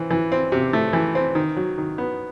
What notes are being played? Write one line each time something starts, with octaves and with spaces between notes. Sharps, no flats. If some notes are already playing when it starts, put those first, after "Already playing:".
Already playing: E3 C4
E3
C4
C3
A3
E3
C4
D#3
F#3
D#3
B3